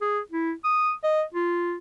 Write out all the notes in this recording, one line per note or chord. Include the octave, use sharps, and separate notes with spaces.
G#4
E4
D#6
D#5
F4